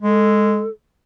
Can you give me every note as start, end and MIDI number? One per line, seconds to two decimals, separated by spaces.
0.02 0.66 56
0.02 0.69 69